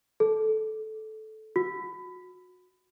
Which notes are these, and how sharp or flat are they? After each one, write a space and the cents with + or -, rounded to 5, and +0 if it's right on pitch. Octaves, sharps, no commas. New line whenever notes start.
A4 -15
F#4 -25